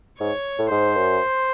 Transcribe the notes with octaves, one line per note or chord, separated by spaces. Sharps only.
G#2 C#5
A2
G#2 C5
F#2